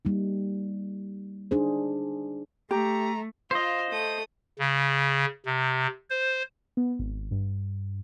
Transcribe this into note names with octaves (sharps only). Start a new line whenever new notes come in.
G3 A#3 D#4
D4 D#4 G#4 C5
A3 G4 A#5
F4 C5 D#5 F5
A3 D#6
C#3
C3
C5
B3
G#1
G2